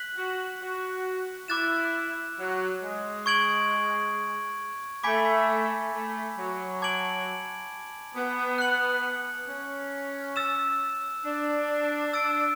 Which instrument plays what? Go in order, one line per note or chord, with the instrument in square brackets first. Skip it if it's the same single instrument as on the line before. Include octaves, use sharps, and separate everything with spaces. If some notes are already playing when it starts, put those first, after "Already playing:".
Already playing: [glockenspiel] F#6 B6 F#7
[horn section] F#4
F#4
[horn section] E4 [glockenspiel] D6 F#6 A6 E7
[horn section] F#3
G#3
[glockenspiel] C#6 G#6 D7 F#7
[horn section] A3 [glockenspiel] G#5 B5 D6 G#6 B6
[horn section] A3
F#3
[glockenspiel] A5 D6 G#6 D7 F#7
[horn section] B3
[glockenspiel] F#6 C#7 F#7
[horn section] C#4
[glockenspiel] E6 A6 E7
[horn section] D4
[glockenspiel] E6 A6 D7